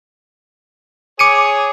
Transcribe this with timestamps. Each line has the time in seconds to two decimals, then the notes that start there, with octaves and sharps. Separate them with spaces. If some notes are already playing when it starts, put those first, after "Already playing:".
1.19 G#4 C#5 D6 C#7 D#7